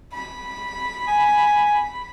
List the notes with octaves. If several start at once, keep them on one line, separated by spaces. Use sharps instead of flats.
B5
G#5